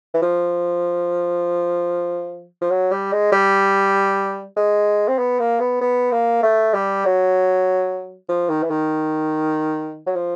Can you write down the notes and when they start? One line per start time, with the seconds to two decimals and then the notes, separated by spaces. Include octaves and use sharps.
0.14 E3
0.22 F3
2.61 F3
2.70 F#3
2.91 G3
3.12 G#3
3.32 G3
4.56 G#3
5.08 C4
5.18 B3
5.40 A#3
5.60 B3
5.81 B3
6.12 A#3
6.43 A3
6.74 G3
7.05 F#3
8.29 F3
8.50 D#3
8.63 E3
8.70 D#3
10.07 F#3
10.15 F3